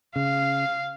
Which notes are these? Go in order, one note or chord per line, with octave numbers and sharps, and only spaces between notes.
C#3 F5